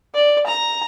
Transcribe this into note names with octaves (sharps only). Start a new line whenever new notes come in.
D5
A#5